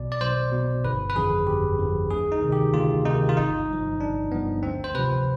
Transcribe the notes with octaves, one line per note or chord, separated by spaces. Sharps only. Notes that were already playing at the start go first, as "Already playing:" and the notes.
Already playing: B1 B2 D5
D5
B1 C5
B2
G1 B4
B4
F2 D3 F3 G#4
G1 G4
F2 D3 F3
D2 G#4
D#4
C3 D#3
G4
D2 F4
C3 D#3 D#4
F4
G1 D#4
G2 F3
G1 D4
G2 F3 B3
D2 C4
C5
C3 F3 B4